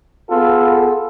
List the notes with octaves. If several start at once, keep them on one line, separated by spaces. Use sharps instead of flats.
B3 F4 G#4 A4